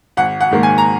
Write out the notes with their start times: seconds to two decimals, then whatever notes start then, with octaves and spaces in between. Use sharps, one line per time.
0.17 G#1 F#5
0.40 F#5
0.51 G#2 D#3 A#3
0.63 G#5
0.78 A#5